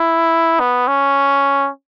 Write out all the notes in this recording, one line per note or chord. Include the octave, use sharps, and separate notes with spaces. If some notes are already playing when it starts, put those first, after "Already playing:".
Already playing: E4
B3
C#4